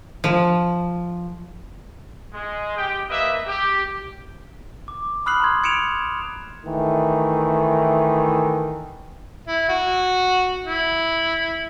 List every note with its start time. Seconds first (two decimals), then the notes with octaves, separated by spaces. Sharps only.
0.24 F3
2.33 G#3
2.77 G4 G5
3.09 A#3 B4 D#5 E5
3.46 G4
4.88 D6
5.26 B5 D#6 F6 F#6 C7 F#7
5.40 A#5 C6 G#6
5.64 G#6 C#7 D7 E7 F7
6.65 D#3 E3 A3
9.48 E4
9.69 F#4
10.63 E4